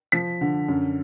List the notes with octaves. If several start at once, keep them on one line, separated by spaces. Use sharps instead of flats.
F3 B6
D3
F#2